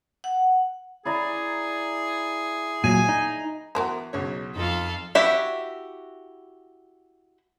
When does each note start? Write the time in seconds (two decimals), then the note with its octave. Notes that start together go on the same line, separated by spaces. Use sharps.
0.24 F#5
1.05 E4 G#4 D5 A#5
2.84 A#2 F#3 G#5
3.09 D#4
3.75 E2 F#4 A#4 C5
4.13 B1 C#3 C#5
4.56 F2 D#4 F4 A4 F5
5.15 E4 F#4 G4 E5